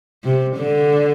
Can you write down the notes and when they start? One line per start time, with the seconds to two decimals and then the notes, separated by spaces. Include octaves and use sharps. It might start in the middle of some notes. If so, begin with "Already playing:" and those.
0.24 C3
0.56 D3